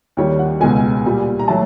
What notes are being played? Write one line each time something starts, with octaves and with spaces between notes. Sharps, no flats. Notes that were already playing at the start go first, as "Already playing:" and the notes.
D#2 D#3 G3 C#5
F#5
C#2 B2 G#3 G#5
A#2 G3
A#5
F#3 A3 A5